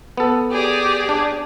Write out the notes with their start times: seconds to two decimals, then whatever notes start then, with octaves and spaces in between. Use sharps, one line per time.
0.17 B3 A4
0.51 G4 G#4 D5
1.09 D4